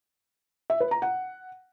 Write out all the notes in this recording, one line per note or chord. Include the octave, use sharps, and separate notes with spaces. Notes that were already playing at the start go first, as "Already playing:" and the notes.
E5
B4
A#5
F#5